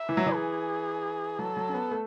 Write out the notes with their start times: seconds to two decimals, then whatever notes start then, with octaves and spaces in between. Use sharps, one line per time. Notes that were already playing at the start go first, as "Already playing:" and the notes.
Already playing: E5
0.09 E3
0.17 F#3
0.26 E3
0.35 G#4
1.39 F#3 A4
1.57 F#3
1.69 C#4
1.74 B3
1.91 A3